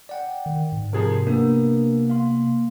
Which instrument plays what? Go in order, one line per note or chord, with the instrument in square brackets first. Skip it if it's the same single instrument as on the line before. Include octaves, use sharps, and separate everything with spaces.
[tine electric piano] D5 F#5 G5
[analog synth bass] D#3
G#2
[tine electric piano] C3 [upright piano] F3 G#4 A#4
[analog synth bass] A#3 [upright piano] B3 [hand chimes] D4 A#4
[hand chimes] F5 C6